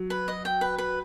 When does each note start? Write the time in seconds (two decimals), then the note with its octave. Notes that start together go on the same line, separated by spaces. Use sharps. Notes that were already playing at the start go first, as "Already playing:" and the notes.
Already playing: F#3
0.10 B4
0.28 D#5
0.45 G5
0.61 B4
0.78 B4